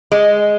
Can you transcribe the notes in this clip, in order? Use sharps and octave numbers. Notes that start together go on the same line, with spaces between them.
G#3